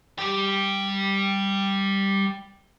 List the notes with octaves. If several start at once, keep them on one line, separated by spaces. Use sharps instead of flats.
G3 G4